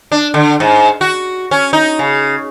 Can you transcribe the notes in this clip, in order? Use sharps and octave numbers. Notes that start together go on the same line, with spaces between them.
D4
D3
G#2
F#4
C#4
D#4
C#3